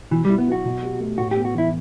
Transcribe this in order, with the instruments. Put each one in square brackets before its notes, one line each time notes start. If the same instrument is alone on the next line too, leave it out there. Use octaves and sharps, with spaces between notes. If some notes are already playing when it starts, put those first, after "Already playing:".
[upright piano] B2 [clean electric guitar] E3
[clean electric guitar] G3
[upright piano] E4
[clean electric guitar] B3
[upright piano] F#3 [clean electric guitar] F#4
[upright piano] B2
G4
A3
[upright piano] A2 [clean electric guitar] F#4
[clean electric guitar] G4
[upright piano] B3
[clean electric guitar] F#4
[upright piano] E3 [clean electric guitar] E4